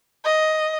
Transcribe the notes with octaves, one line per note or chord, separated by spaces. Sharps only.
D#5